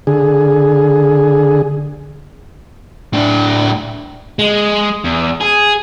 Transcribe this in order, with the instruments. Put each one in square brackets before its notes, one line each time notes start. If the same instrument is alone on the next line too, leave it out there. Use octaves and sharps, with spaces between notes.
[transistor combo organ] D3 G#4
[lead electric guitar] A2 D4
[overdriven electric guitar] G#3
E2
G#4